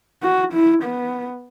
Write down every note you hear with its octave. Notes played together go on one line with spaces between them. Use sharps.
F#4
E4
B3